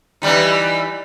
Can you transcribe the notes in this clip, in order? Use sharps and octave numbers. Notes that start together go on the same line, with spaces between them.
E3 G3 D#4